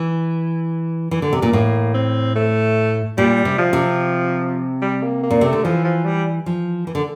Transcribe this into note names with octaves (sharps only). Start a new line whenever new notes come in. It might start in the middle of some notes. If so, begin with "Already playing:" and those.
Already playing: E3
E3
D3
C3
A#2
A2 A#3
C4
A3
A#2 G3
C3
F3
C3
G3
A#3
A#3
A#2
C3 A3
D3
E3 F3
F3
G3
F3
E3
D3